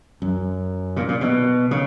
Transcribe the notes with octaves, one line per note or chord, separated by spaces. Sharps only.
F#2
A#2
A#2
B2
C#3